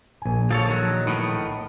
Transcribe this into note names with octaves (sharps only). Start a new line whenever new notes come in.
A#1 G#5
F3 A4 C#5
D#3 F#3
A2 D#3 B3